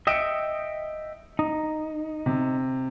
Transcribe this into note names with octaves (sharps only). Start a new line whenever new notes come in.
D#5 E5 G5 C#7 D7 E7
D#4
C3